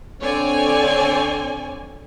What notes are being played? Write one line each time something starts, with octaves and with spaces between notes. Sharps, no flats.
D3 C4 C#5 D5 G#5